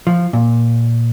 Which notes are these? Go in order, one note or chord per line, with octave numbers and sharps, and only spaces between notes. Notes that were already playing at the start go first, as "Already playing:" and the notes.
F3
A#2